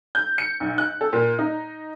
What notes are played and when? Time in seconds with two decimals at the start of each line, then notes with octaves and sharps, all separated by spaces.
0.15 G6
0.38 C#7
0.60 B1
0.78 F#6
1.01 A4
1.13 A#2
1.39 D#4